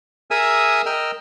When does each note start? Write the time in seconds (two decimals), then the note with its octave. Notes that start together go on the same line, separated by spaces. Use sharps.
0.31 G#4 A#4 E5 G#5 D#6 E6
0.86 A#4 D#5 G5 E6 F6